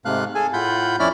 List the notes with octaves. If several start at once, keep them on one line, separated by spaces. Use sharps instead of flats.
G#2 C3 A3 F5 F#6
G#4 A4 G#5
A2 F4 F#5 B5 G6
F2 C#4 E4 D5 B5 F6